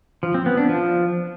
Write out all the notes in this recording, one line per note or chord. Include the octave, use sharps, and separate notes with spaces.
F3
C4
B3
D4
F3